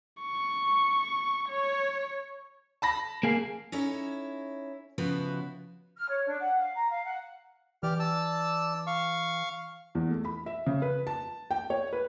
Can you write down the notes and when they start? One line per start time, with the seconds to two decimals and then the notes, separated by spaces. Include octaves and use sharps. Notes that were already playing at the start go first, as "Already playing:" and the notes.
0.22 C#6
1.50 C#5
2.82 A5 B5 A#6
3.23 A#3 G#4 F5
3.72 C#4 D#4 E4 A4 C#5
4.98 C#3 F3 B3 E4 F#4 B4
5.96 F6
6.08 C#5
6.26 D4
6.40 F#5
6.58 F5
6.75 A#5
6.89 F5
7.04 F#5
7.83 E3 G4 D5 F6
7.99 D5 A5 E6
8.87 F5 C#6
9.95 E2
10.11 A3
10.25 B5
10.46 E5
10.66 C#3
10.82 B4
11.07 A5
11.51 G5
11.70 C#5
11.93 B4